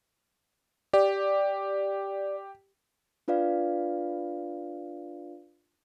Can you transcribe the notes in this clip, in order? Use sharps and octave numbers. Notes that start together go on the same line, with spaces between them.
G4 D5
D4 F4 B4 D5 F5